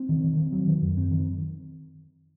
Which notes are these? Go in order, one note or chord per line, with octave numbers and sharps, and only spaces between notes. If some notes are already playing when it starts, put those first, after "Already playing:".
Already playing: C4
D#3
D#3
C4
F#3
D#3
F#2
C4
D#3